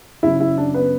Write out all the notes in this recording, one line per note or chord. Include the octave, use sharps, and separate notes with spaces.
F#1 F#2 C#3 F#3 C#4 E4 E5
E4 E5
D4 D5
B3 B4